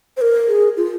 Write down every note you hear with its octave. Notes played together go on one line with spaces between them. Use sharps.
C5
A#4
G#4
F4